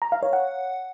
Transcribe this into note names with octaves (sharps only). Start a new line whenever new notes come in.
A#5
F5
C#5
F#5